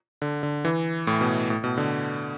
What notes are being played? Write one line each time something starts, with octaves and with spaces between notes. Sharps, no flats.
D3
D3
E3
A2
B2
A2
B2
D3